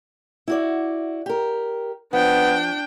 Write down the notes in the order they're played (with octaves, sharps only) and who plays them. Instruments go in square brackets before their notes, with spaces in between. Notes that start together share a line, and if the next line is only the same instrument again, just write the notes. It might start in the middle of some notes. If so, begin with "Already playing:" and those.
[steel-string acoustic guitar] E4 F#4 D5
G4 A#4
[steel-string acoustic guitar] F3 [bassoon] B3 [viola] D4 G5